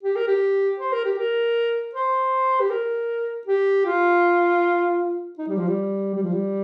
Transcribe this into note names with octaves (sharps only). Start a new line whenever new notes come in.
G4
A#4
G4
C5
A#4
G4
A#4
C5
G4
A#4
G4
F4
D#4
G3
F3
G3
G3
F3
G3